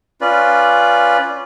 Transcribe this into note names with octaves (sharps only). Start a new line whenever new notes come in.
C#4 F4 B4 D5